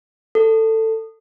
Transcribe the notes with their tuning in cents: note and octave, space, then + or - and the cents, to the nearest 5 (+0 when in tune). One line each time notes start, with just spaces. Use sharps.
A4 +15